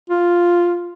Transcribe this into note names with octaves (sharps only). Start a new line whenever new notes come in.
F4